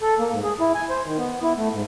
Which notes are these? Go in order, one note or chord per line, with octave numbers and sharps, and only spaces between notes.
A4
A#3
G#2
G#4
E4
G#5
C5
D#3
B3
E4
A3
G#2